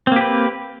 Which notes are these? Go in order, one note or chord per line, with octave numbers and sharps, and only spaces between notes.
A#3 C4 G4 B4